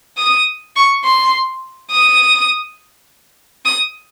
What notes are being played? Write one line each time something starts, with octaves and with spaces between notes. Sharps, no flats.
D#6
C#6
C6
D#6
D#6